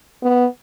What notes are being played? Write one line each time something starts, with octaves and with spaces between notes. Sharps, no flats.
B3